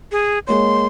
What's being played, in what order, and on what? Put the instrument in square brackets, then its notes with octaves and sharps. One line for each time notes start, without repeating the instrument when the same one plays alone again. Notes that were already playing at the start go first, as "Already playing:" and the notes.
[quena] G#4
[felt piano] G#3 A#3 C#5 [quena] C6